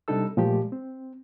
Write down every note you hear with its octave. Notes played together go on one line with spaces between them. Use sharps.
C3 G3 D4 D#4 A4 E6
A#2 F3 G#3 A3 G4
C4